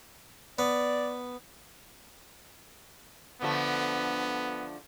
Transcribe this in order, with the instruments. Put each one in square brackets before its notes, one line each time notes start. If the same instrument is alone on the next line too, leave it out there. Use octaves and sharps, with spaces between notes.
[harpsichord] B3 [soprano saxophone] D5
[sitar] D3 F3 A3 [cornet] B3